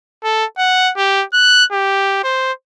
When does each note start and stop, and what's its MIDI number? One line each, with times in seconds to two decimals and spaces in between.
0.24 0.45 69
0.58 0.92 78
0.97 1.24 67
1.33 1.65 90
1.72 2.23 67
2.24 2.52 72